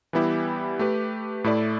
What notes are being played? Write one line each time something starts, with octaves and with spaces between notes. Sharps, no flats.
E3 G3 B3 E4 G4
A3 G4 B4
A2 A3 E4 A4 D5